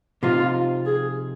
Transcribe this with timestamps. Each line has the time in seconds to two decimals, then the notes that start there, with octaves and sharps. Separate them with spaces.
0.23 C3 F3 C4 D#4 F4
0.86 G#4